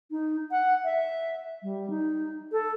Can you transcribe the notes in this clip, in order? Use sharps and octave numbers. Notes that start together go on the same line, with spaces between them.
D#4
F#5
E5
G3
D#4
A4